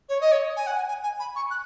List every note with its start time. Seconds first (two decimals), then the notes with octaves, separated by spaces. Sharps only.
0.09 C#5
0.21 D#5
0.32 C#5
0.56 G#5
0.67 F#5
0.77 G#5
0.88 G#5
1.03 G#5
1.19 B5
1.36 C#6
1.51 F#6